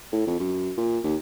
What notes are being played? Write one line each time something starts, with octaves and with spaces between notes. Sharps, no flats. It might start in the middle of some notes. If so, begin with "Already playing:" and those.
A2
F2
F#2
A#2
D#2